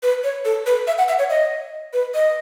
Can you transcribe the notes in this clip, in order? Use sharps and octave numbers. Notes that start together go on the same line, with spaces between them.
B4
C#5
A4
B4
E5
F#5
E5
C#5
D#5
B4
D#5